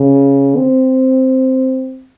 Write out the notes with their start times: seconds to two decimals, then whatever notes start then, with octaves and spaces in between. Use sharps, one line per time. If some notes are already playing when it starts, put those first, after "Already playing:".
Already playing: C#3
0.56 C4